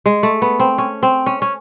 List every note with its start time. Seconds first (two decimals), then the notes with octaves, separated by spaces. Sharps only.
0.06 G#3
0.23 A3
0.42 B3
0.60 C4
0.78 C#4
1.03 C4
1.26 C#4
1.42 C#4